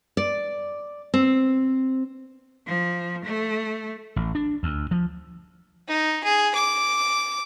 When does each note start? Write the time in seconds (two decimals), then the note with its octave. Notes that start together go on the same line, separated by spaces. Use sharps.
0.17 D5
1.14 C4
2.67 F3
3.25 A3
4.16 A1
4.35 D4
4.63 D2
4.91 F3
5.88 D#4
6.24 G#4
6.55 D6